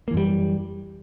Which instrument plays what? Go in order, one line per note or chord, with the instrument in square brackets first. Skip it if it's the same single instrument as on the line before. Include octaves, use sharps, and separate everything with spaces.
[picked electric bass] A#3
E3
F#2
G3